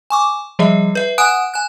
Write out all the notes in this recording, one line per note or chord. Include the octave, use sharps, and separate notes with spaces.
G#5 C#6 D6
F3 G3 G#4 E5
B4 E5
F#5 G#5 D#6 F#6 D7
G#5 F#6